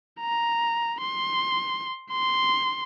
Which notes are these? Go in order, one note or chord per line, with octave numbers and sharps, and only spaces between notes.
A#5
C6
C6